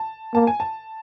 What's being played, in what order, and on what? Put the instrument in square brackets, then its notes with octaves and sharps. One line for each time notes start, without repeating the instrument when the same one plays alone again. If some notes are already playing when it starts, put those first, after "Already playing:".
Already playing: [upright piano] A5
[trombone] A#3 [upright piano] A5
[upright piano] G#5
A5